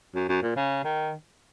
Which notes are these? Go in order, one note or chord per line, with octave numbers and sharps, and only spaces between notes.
F#2
F#2
A#2
C#3
D#3